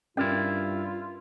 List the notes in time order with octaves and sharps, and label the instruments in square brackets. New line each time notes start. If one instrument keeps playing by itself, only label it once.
[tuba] G2 [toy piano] C#4 [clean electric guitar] E4 A#4 D5 [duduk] F4